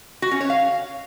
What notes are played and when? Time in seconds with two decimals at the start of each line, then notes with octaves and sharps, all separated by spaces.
0.22 F#4
0.31 C#4
0.41 C#5
0.50 F5